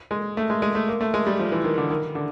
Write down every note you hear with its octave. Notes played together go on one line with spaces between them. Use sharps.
G#3
A3
G#3
G#3
A3
A#3
A3
G#3
G3
F3
E3
D#3
D3
D#3
D3